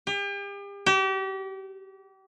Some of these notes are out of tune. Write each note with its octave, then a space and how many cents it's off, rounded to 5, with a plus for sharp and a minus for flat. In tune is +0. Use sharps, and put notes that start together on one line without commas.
G4 +40
G4 -35